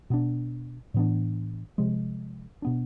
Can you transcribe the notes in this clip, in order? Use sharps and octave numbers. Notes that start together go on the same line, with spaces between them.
B2 B3 D4
A2 E3 B3 D4
C3 F3 G#3
B2 B3 D4